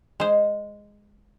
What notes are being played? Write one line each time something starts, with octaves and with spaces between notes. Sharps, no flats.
G#3 C5